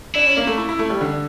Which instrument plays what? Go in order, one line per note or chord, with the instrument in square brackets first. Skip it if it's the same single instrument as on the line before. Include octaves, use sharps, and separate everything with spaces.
[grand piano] D4 [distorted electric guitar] E4
[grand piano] C#4
A#3
A3
E4
E4
A3
G3
D3